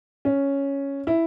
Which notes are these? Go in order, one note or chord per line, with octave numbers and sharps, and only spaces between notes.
C#4
E4